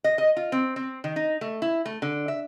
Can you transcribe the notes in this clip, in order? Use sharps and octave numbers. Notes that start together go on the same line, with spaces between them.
D#5
D#5
F4
C4
C4
D#3
D#4
A3
E4
A3
D3
E5